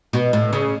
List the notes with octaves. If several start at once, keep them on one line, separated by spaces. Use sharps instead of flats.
B2
A2
C#3